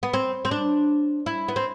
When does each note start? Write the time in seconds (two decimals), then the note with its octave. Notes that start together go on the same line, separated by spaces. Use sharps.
0.03 B3
0.13 C4
0.45 C4
0.51 D4
1.26 E4
1.48 B3
1.56 C4